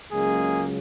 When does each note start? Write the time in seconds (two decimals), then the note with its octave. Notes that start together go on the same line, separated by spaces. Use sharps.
0.12 C#2 C#3 F#3 G#3 A#3 G#4